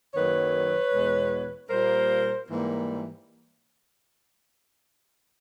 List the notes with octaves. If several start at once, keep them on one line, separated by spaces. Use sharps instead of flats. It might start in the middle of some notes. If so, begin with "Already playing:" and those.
F#2 D#3 F#3 A#3 B4 C#5
E2 B2 G#3
A#2 G3 A#3 A#4 C5
G#2 E3 G3 A#3